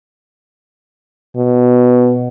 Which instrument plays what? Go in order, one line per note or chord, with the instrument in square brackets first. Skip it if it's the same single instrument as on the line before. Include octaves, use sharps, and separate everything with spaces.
[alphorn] B2